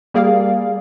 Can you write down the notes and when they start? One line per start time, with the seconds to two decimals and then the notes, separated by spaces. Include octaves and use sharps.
0.14 G3 A#3 G#4 D5 F5